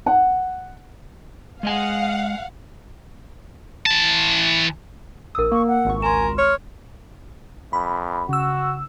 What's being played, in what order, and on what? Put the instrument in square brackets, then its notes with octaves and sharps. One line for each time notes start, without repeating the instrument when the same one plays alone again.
[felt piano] F#5
[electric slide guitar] G#3 D#5 G#5 [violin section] F5 F#5
[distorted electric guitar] E3 A5
[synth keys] A#1 D#6 [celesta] A#4 E6
[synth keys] A#3 [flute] C#6
[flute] F#5
[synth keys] G#1 C#2 C#6
[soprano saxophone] A#4 [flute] G#5 [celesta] C6 E7
[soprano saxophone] C#5 [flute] F6
[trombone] F2 [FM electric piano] B5
[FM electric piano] C#3 E6 [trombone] F#4